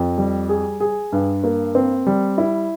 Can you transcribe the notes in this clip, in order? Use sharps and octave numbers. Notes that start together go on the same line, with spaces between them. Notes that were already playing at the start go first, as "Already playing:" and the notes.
Already playing: F2
G3
G#4
G#4
G2
A#3
C4
G3
E4